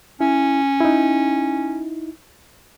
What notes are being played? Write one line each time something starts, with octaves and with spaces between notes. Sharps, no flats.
C#4 E4
D#4 E4